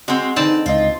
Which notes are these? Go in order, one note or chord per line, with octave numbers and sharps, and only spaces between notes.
G#3 C4 F#4
D3 E3 C4 D#4 B4 D5 A5
C#2 F4 D#5